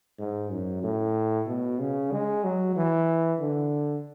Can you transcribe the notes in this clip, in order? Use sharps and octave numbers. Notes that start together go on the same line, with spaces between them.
G#2
F#2
A2
B2
C#3
G#3
F#3
E3
D3